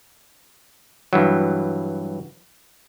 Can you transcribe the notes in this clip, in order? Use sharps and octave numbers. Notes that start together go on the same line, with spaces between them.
G2 E3 F#3